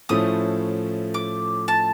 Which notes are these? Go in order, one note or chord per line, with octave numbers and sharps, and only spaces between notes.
A2 F3 A3 C#4 E4 D#6
D6
A5